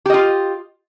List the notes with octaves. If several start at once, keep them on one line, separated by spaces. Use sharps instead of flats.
F4 G4 D#5